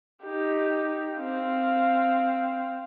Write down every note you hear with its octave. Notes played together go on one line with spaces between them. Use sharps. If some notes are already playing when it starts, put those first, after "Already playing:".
D#4 G4
C4 F5